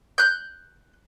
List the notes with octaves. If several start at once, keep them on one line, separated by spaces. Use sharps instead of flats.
F#6 G6